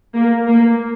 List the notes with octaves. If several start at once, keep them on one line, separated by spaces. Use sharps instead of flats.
A#3
A#3